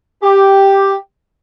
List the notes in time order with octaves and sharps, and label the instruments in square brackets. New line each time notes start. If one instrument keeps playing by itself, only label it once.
[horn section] G4